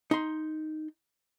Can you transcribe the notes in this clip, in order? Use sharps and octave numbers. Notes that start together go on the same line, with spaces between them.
D#4 C6